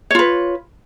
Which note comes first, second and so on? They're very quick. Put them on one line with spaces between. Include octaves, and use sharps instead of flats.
C#5 F4 B4